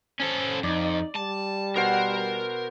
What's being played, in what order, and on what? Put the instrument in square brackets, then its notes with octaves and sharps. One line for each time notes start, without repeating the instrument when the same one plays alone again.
[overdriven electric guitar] C#4 A4 [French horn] C5
[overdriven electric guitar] F2 [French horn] D#4 [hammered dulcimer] D5
[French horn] G3 [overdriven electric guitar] A5
[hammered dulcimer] B2 C5 F#5 [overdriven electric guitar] A#4